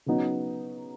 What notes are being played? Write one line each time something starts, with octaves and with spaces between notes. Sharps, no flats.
C#3 F#3 B3 D#4